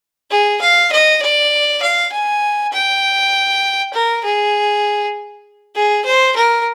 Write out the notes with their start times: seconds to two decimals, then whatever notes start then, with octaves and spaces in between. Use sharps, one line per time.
0.31 G#4
0.61 F5
0.92 D#5
1.22 D5
1.82 F5
2.12 G#5
2.73 G5
3.94 A#4
4.24 G#4
5.76 G#4
6.05 C5
6.36 A#4